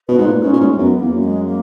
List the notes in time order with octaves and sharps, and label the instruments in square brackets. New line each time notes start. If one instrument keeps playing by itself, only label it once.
[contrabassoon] B2 [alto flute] B4
[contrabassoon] G#2
A#2
[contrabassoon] G#2 [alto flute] C#4
[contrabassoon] A#2
G#2
G#2
[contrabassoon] F#2 [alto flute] B3
[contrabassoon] E2 [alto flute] A#3
[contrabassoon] F#2
[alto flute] G#3
A#3